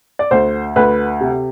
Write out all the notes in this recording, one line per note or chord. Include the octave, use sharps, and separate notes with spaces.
D5
D2 C5
D2 B4
C3